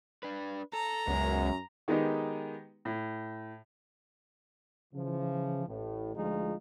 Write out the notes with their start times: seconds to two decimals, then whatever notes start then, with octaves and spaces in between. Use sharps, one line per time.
0.23 D4 B4
0.73 A4 A#5
1.08 C#2 F#2 G#3 B3
1.88 D#3 G#3 B3 D#4 G4
2.85 A2
4.93 C#3 E3 F3
5.67 A1 A2
6.16 D2 F3 G#3 D#4 F4 G#4